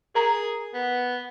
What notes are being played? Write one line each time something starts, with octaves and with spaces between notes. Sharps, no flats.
G#4 A#4 A#5
B3